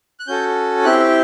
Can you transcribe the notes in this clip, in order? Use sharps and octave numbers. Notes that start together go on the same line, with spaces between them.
F#6
C#4 F#4 A4 G6
C4 E4 G4 F#6